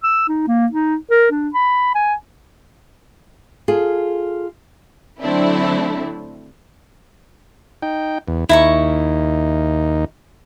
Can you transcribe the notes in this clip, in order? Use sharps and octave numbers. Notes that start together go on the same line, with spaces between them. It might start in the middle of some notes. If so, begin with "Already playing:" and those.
E6
D#4
A#3
D#4
A#4
D4
B5
G#5
F4 G#4 A4
D3 F#3 A3 C4 D4 E4
D#4 G5
E2
D#2 D#4 E4 A#5 C#6